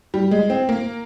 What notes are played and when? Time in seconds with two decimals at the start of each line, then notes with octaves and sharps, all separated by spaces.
0.14 G3
0.31 G#3
0.50 C4
0.69 A#3